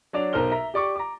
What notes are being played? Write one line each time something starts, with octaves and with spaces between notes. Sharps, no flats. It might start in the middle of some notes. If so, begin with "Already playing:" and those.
F#3 D4 D5 F7
B1 A#4 C5 F6 G7
E5 A#5
G4 D5 C#6 D6
A#5 D6